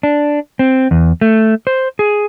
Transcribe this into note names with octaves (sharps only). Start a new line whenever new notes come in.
D4
C4
E2
A3
C5
G#4